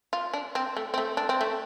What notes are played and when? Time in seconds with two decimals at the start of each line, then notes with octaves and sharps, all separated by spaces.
0.13 F4
0.33 D4
0.55 C4
0.77 A3
0.94 C4
0.98 A3
1.17 D4
1.29 C4
1.41 A3